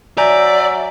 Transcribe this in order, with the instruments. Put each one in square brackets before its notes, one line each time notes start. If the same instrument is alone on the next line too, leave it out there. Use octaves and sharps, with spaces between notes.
[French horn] F#3 [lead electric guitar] D5 [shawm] E5 [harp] G#5 A#5 G6